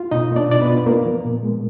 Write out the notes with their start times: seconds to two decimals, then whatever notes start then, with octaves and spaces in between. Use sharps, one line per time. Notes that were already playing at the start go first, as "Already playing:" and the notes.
Already playing: F4
0.11 B2 D#4 D#5
0.31 A#3
0.36 D4 D5
0.49 B2 D5
0.61 B3 B4
0.68 F4
0.86 A#3 B3 A#4
1.05 F3
1.25 A#2
1.43 G#3